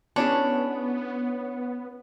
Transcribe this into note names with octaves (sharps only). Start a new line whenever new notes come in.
B3 C#4 D4 E4 G#4 C#5